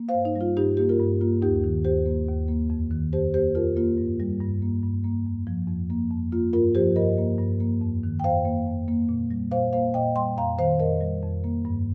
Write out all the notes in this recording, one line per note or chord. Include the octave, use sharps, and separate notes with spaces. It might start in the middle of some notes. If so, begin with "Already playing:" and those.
Already playing: A#3
C5 F5
G2
D#4
G3
F4
G2 D#4 G4
A#3 G4
F4 A#4
G2
A#3 F4
D#2 D#4 G4
D#3
D#2 G4 C5
A#3
D#2
A#3
F2
D#3
F2 G4 C5
A#3 G4 C5
F2 F4 A#4
A#3 F4
G2
G3
G2
A#3
G2
A#3
F2
F3
F2
A#3
F2
A#3 F4
G2 F4 A#4
F3 G4 C5
G2 A#4 D#5
A#3
G2
A#3
F2
D#3
G5
F2 C5 F5
A#3
F2
A#3
A#2
G3
A#2 C5 F5
A#3 C5 F5
A#2 D#5 G5
G3 G5 C6
F2 F5 A#5
D#3 C5 F5
F2 A#4 D#5
G3
F2
A#3
G2